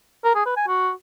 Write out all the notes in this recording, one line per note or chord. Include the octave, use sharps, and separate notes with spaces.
A#4
G#4
B4
G#5
F#4